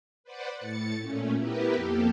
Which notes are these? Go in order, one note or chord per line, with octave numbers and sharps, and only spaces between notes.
B4 C5 D5 F#5
A2 A6 C#7
A#2 A3 C#4
B3 E4 G4 A#4 B4
F2 A#3 G4 A4